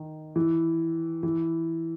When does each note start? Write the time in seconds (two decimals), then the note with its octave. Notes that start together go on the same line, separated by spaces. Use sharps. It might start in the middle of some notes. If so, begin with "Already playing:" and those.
Already playing: D#3
0.36 E3
1.23 E3